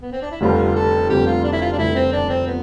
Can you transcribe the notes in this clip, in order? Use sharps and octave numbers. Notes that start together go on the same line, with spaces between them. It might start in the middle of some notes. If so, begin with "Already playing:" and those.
B3
C4
D4
E4
F1 F2 D3 G3 F4
A4
F1 F2 D3 G3 G4
F4
D4
E4
F4
D4
F1 F2 D3 G3 E4
C4
D4
C4
B3